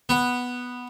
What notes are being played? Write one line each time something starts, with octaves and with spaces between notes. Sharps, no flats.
B3